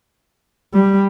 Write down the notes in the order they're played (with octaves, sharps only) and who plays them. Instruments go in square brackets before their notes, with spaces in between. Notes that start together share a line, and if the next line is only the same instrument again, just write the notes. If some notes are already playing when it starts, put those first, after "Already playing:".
[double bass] G3